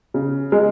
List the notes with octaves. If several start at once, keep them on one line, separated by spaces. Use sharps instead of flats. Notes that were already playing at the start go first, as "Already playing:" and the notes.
C#3
G#3